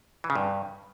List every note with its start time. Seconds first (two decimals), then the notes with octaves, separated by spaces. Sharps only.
0.24 E3
0.30 C#3
0.35 G2